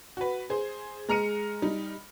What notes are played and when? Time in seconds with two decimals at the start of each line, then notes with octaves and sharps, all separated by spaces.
0.17 F#4 B4
0.50 G#4 C5
1.09 G#3 A#5 F6 C#7 D#7
1.62 G3 D#4